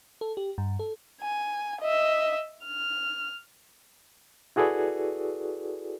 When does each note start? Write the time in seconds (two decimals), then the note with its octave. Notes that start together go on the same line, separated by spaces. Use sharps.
0.21 A4
0.37 G4
0.58 G2
0.79 A4
1.21 G#5
1.81 D#5 E5
2.65 F6
4.56 E4 F#4 G#4 A4 B4 D5